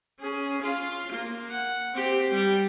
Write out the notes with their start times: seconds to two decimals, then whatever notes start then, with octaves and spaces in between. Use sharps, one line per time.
0.20 C#4 G#4
0.62 F4 F5
1.12 A#3
1.50 F#5
1.95 C4 G4
2.31 G3